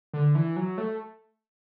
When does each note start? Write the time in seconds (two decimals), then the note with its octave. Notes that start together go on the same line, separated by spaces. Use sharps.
0.13 D3
0.35 E3
0.56 F#3
0.78 A3